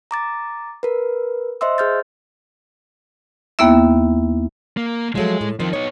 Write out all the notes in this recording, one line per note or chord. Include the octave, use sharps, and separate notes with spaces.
A#5 D6 A6
A#4 B4
C5 D#5 E5 C6 E6
G#4 C5 F6 G6 A6
D#2 A#3 B3 E4 E5
A#3
F3 F#3 G#3 A3
A2
D#3 F3 C4
B3 D#4 C#5